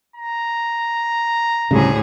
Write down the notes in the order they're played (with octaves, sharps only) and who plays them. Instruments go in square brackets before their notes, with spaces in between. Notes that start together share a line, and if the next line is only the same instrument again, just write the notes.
[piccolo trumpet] A#5
[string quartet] D2 A2 G#4 [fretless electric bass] C#3 G3